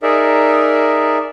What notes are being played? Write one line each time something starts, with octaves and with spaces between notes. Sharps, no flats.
D#4 G#4 A#4 D5 E5